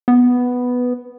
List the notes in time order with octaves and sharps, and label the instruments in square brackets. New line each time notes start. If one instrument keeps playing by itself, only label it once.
[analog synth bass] B3